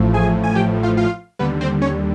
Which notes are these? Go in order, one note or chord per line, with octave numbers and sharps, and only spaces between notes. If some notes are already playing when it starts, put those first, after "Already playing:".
Already playing: A1 A2 F3 A3
G#4 G#5
G#5
G4 G5
F4 F5
F4 F5
D#2 D3 G3 B3 B4
C4 C5
C#4 C#5